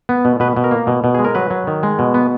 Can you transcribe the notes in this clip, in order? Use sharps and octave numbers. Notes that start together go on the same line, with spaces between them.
B3
B2
B2 B4
B2
A#4
A#3
B2
B2
G#3 G#4
A#4
F#3 B4
F#3
D#3
G#3
B2
B3